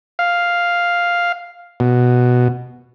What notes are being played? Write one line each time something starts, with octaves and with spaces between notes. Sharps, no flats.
F5
B2